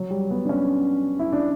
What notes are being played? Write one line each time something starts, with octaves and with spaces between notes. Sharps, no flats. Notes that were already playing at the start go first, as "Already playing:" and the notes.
Already playing: F#3
G3
B3
D4
C#4
E4
D4